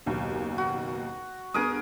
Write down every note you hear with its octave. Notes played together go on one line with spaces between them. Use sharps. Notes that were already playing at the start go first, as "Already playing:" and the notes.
F#1 D#2 B2
F#4
G2 B3 G#4 A#4 D#6